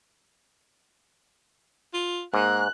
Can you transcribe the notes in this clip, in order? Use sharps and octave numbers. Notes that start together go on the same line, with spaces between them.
F4
G#2 A#3 F#6